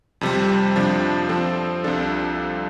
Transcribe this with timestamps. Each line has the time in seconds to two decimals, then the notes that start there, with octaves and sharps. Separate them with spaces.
0.21 F2 C3 G3
0.76 F2 C3 F3 D4
1.29 F3 C4 A4
1.84 C2 C3 F3 D4 A4